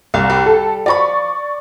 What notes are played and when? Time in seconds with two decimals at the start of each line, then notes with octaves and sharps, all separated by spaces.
0.14 C2 F5
0.30 G3
0.46 A4
0.86 F3 D5 A#5 B5 C#6